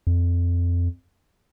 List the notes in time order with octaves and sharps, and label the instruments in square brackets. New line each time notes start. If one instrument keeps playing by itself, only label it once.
[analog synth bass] F2